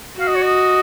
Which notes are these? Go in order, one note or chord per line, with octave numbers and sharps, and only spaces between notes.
F#4 F5
D#5
C#5
D#5